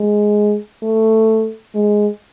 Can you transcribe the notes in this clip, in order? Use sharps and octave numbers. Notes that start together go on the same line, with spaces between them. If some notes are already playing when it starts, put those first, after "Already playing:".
Already playing: G#3
A3
G#3